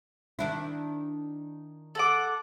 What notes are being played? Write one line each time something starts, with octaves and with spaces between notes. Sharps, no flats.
D#3 D4 E4
A4 F#5 D6